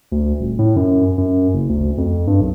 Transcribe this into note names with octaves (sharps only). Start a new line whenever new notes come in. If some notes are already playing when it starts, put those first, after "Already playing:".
D2
D#1
A2
F#2
F#2
F#1
D2
F2
G2
B1